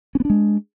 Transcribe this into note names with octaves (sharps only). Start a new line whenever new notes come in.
G#3 B3 C#4 D4